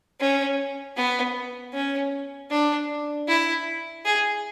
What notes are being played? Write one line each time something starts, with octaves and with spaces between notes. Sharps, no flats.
C#4
B3
C#4
D4
E4
G#4